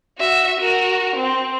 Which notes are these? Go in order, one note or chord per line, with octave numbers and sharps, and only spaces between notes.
F#4 E5
F#4 A#4
C4